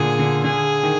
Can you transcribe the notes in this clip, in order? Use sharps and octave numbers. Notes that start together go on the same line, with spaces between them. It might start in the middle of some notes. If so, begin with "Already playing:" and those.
Already playing: A#2 D3 G#4
D3
D3 G#4
D#3